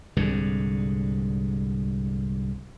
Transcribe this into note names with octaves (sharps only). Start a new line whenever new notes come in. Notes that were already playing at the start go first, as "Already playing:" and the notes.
C2 G#2 D3